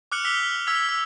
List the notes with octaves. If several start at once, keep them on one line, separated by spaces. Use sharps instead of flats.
D6 F6 F#6 C#7 F#7
E6 F6 B6 F7 G7
E6 G#6 B6 F7
E6